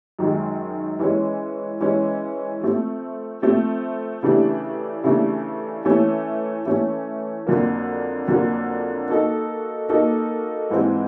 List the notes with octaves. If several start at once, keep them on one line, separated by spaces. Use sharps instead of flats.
F#2 D#3 G#3
E3 G#3 C#4
E3 G#3 C#4
F3 A3 C4
F3 A3 C4
C#3 E3 A3 D4 G4
C#3 E3 A3 D4 G4
E3 A3 C#4
E3 A3 C#4
F2 D3 F#3 A#3
F2 D3 F#3 A#3
A#3 D#4 F#4 A4
A#3 D#4 F#4 A4
G#2 E3 G#3 C4 F4